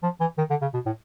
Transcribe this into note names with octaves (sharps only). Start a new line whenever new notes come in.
F3
E3
D#3
D3
C#3
B2
A2